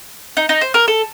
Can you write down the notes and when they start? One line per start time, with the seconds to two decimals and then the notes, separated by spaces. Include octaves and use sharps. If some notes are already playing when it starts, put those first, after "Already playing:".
0.37 D#4
0.49 D#4
0.61 C5
0.74 A#4
0.88 A4